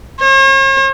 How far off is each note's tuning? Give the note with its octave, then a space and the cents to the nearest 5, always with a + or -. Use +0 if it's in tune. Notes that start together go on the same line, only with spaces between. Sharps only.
C#5 -45